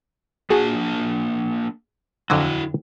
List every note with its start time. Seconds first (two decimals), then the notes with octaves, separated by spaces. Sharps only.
0.50 A#3 D4 F#4 G#4 A5
2.30 F2 D3 F#3 E4 F#4